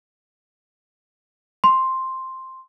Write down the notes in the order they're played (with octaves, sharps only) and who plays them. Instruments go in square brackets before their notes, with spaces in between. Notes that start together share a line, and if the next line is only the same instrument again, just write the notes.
[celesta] C6